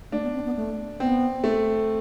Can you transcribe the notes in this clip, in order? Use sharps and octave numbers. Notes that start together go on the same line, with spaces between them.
A3 D4
B3
C4
B3
A3
B3 C4
A3